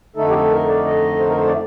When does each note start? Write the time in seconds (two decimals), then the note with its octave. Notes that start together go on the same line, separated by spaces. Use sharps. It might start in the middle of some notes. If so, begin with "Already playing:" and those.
0.16 F2 D3 A3 D#4 A4
0.29 G4
0.34 A4
0.51 A#4
0.68 D5
0.85 D#5
1.19 C5
1.28 A#4
1.36 C5
1.47 D5